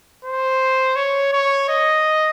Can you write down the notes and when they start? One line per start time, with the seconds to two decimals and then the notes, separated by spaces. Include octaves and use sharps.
0.25 C5
0.96 C#5
1.33 C#5
1.69 D#5